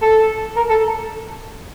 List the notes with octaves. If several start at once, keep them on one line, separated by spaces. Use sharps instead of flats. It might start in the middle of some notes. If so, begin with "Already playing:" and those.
A4
A#4
A4